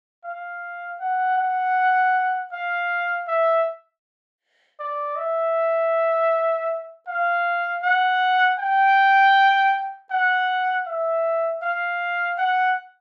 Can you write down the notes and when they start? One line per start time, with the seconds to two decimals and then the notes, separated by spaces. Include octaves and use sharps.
0.24 F5
1.00 F#5
1.38 F#5
2.52 F5
3.28 E5
4.79 D5
5.17 E5
7.07 F5
7.83 F#5
8.58 G5
10.11 F#5
10.86 E5
11.62 F5
12.38 F#5